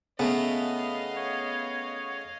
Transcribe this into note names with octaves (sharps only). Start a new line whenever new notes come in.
C#3 A3 B3 D#5 F5
C#5